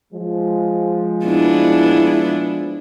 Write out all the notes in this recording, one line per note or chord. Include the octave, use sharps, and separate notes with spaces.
F3 G#3
B3 D4 E4